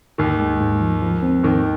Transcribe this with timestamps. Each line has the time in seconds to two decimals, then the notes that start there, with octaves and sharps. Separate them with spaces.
0.18 D#2 G#2 D#3
0.39 G#3
0.61 G#2
0.81 F3
1.02 F3
1.23 C4
1.43 D#2 G#2 D#3